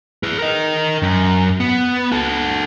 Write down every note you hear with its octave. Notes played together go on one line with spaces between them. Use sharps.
G#4 B4
A#4 D#5
F#2
B3
F#4 A4